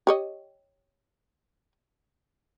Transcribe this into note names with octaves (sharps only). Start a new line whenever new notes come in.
G4 C#5 D#5